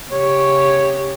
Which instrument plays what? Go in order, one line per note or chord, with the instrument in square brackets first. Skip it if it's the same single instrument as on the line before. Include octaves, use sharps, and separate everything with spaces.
[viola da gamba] C#3 G4 [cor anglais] C#5